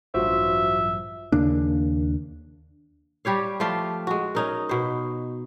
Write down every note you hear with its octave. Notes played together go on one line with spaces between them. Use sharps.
A1 G2 F#3 F4 F#4 C5 E5
D#2 C#3 A#3 D4
G3 G4 C#5 F5
F3 A3 F4 G4
G#3 F#4
C#4 D#4 A#4
B2 C5